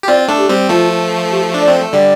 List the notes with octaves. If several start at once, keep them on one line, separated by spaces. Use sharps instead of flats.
G4
C4 F4 D5
A3 D4
G4
G3 C4
F3 A3 F4
G4
D4
D5
C4
A3
D3 G3 D5